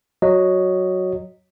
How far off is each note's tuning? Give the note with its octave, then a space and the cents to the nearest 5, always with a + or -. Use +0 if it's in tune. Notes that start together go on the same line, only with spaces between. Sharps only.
F#3 +0 D#5 +0